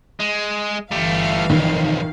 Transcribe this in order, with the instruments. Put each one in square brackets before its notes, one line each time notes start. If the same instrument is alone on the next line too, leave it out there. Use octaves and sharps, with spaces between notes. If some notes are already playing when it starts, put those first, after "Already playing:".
[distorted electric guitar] G#3
[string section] G1 E3 F5 [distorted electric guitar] A3 G4
[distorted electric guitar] B1 F2 [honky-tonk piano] D#3